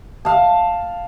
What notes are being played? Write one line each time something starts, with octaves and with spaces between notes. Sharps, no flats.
F5 A5